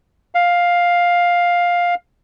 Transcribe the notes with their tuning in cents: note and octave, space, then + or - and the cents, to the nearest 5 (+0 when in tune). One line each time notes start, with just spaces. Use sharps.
F5 +10